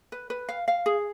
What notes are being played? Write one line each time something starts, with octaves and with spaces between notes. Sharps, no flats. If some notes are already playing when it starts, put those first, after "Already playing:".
B4
B4
F5
F5
G#4